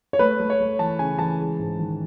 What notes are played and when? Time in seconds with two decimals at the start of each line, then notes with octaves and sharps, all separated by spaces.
0.13 C#5
0.19 A3 B4
0.40 A3
0.50 C#5
0.60 A3
0.79 E3 A5
0.99 C#3 G#5
1.19 E3 A5
1.39 G#3
1.59 G#2
1.80 D#3